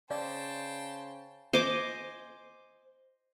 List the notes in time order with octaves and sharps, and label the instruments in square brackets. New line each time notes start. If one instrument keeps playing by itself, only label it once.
[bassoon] C#3 [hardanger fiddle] C5 [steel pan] D5 [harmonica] G5 A5
[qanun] C5 D#5 G#5 D6